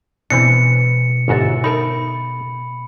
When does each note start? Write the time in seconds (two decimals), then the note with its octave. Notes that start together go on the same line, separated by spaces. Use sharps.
0.30 B2 E3 B3 C4 D4 C#7
1.28 G1 G#2 F#4 C#5 E5 A6
1.64 D#4 A4 A#4 B5